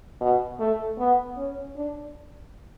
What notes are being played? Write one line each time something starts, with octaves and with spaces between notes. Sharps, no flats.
B2
A3
B3
C#4
D4